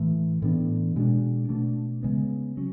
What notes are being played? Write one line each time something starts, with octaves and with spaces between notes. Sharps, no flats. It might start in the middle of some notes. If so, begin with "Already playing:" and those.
Already playing: A2 E3 A3
A2 E3 B3 D4
B2 G#3 D4
B2 A3 D4
C#3 G#3 B3
F#3 C#4